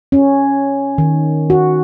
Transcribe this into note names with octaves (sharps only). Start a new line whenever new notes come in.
C#4
D#3
F#4